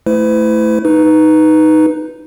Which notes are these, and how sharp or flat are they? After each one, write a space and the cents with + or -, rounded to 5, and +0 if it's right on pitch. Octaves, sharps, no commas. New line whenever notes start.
A3 +0 E4 +0 B4 +45
D#4 +0 B4 +0